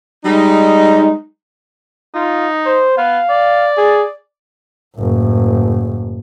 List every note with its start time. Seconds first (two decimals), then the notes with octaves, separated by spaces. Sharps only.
0.25 G3 G#3 D#4
2.15 D#4 F4
2.66 C5
2.98 B3 F5
3.30 D5
3.77 G#4
4.97 F#1 A2